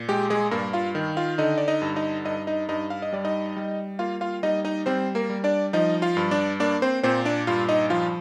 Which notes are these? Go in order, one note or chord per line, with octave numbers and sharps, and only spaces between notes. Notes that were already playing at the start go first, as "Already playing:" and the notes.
Already playing: A#2
G#3 G4
G#3 G#4
G2 A#3 A#4
F4 F5
D#3
F4 F5
D3 D#4 D#5
D5
D#4 D#5
G2
D#4 D#5
G2 D#4 D#5
D#4 D#5
G2 D#4 D#5
F5
D#5
G3 D5
D#4 D#5
G3
A#3 F4 F5
F4 F5
G3 D#4 D#5
D#4 D#5
G3 C4 C5
A#3 A#4
G3
D4 D5
F3 D#4 D#5
F4 F5
G2
D4 D5
A#3 D4 D5
C4 C5
A#2 C4 C5
D4 D5
G2 F4 F5
D#4 D#5
F3 F4 F5